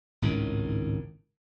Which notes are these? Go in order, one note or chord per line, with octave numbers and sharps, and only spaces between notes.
G#1 C#2 A2 D#3